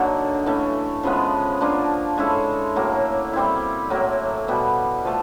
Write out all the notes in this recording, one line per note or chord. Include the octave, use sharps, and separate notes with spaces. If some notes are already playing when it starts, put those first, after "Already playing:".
Already playing: D3 F#3 A#3 D#4
E3 A3 C#4
C#3 F3 G#3 B3
F3 A#3 D4 F4
G#3 C#4 E4 A4
A2 F#3 A#3
G3 C4 E4
A2 F#3 A#3
B2 G3 B3
F3 A3